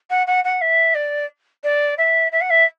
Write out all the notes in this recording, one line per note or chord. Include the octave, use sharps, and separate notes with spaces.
F#5
F#5
F#5
E5
D5
D5
E5
E5
F#5
E5